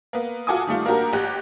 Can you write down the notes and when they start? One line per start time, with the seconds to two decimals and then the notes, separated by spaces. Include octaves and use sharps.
0.13 A#3 B3
0.47 F4 F#4 A4 G#5 D6 D#6
0.67 D#3 G3 A3 F4
0.86 A#3 D4 F#4 G4 A#4
1.13 A1 G4 F#6